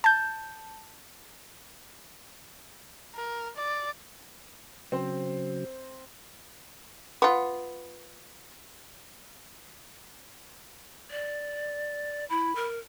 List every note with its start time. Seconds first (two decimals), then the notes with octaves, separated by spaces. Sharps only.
0.04 A5 G6
3.15 A#4
3.56 D5
4.92 C#3 F#3 C4 C5
7.22 B3 F4
11.11 D5
12.30 E4 B5
12.56 A#4